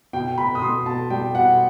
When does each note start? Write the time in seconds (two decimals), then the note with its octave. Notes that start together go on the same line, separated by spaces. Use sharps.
0.13 B2 G5
0.37 B2 B5
0.55 D#6
0.62 B2 C6
0.86 B2 A5
1.10 G3 G5
1.35 B2 F#5